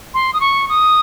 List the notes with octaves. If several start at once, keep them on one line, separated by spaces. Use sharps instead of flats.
C6
D#6
C#6
D#6